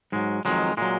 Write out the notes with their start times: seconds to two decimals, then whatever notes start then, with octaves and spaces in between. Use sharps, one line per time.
0.12 G#2 F#3 G#3
0.45 F2 D#3 F#3 G#3
0.77 A#2 F#3 G#3